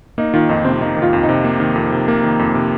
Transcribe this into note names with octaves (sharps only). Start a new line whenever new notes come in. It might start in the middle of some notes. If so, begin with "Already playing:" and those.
A#3 D#4
D#3 F4
F2 D#4
C3 C4
A#3 D#4
D#3
F4
F2
D#4
C3
A#3
D#3
F2
C3
A#3
D#3
F2
C3